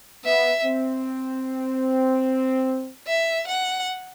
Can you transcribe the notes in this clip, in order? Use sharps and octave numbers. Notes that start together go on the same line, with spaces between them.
B3 E5
C4
E5
F#5